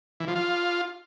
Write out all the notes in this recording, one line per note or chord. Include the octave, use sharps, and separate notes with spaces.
E3
F3
F4